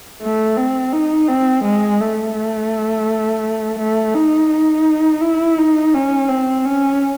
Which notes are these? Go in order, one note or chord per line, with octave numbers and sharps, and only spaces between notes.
A3
C4
D#4
C4
G#3
A3
A3
D#4
D#4
E4
D#4
C#4
C4
C#4